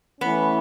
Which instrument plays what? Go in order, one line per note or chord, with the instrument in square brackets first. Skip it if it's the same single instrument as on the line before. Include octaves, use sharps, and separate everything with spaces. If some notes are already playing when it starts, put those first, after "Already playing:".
[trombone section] E3 A3 C#4 [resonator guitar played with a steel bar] B3